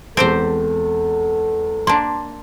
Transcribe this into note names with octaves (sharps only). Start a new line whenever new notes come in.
E2 G#3 C4 G4 A4 C5 A5
A#3 D4 A5 C6